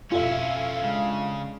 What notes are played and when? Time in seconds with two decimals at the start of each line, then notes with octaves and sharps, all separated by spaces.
0.12 F2 B2 C#4 E4 F4 A4 E5 F5
0.82 C#3 G#3 D4